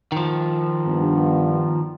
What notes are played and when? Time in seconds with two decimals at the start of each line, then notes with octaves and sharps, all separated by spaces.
0.12 D#3 F3
0.88 G2 B3